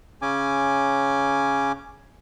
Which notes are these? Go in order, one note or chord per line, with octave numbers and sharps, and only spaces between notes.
C#3 C#4 G#5 D6